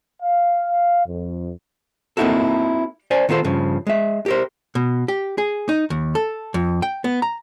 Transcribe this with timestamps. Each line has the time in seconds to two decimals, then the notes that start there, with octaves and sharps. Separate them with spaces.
0.23 F5
1.07 F2
2.17 A#3 C4 D#4 E4 F#4 A4
3.11 C5 D5 G#5
3.29 D#3 B3 F4 A4 C5
3.44 G2 C#3 F3
3.87 G#3 E5
4.26 G4 A#4 C5
4.75 B2
5.08 G4
5.38 G#4
5.69 D#4
5.90 D#2
6.15 A4
6.54 F2
6.82 G5
7.04 B3
7.22 A#5